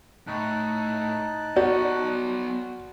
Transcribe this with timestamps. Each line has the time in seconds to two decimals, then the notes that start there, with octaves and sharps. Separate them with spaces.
0.27 A2 D#4 A5 F#6
1.57 B3 F#4 C#5 D5